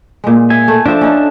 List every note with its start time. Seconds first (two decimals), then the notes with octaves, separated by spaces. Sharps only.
0.24 A#2 G#3
0.50 E5 G#5
0.68 A3
0.86 F3 C4 D4 F4 E5
1.01 C#4 D#4 A4